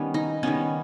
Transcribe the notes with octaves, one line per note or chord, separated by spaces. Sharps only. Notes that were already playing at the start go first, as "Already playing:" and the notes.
Already playing: D#3 G3 B3 C#4
D#4
D#3 G3 B3 C#4